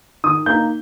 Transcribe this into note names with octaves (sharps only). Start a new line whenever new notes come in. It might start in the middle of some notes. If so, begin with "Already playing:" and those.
D#3 D#6
A#3 D#4 G6